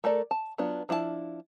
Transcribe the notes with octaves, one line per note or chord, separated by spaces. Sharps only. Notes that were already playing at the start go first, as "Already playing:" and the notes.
A3 A4 A#4 D5
A5
F#3 B3 D4 F4
F3 D4 E4 F4 A5